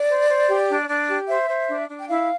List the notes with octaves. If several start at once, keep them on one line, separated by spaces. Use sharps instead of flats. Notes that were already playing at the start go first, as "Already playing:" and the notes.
Already playing: D5
C5
C5
G4
D4
D4
G4
C5 E5
C5
D4
D4
G5
E4 F5